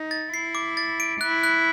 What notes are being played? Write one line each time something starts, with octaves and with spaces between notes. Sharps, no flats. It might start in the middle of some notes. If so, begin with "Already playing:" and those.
Already playing: D#4
A6
E4 C7
D6
A6
D7
E4 F#6
F#6